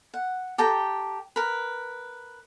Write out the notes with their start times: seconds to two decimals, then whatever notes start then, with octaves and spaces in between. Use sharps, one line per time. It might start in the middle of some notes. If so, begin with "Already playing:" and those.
0.14 F#5
0.58 G4 A4 G5 A#5
1.36 A#4 B4